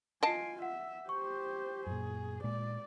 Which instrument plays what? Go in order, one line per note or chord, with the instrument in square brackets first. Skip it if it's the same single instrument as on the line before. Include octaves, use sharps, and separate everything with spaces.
[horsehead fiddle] F4 G#5 [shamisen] D#5 A5 [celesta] C7 D7
[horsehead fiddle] E5 [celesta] F#5
[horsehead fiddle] G4 C5 [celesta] C#6
[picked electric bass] F#2 A#2 [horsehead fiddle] G#4
[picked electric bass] A#2 G#3 [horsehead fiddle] D5